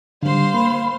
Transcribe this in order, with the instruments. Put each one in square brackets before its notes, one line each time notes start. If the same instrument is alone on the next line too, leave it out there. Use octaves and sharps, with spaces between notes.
[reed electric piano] D3 G3 [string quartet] C5 F5 C6
[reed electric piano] A#3 [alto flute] B5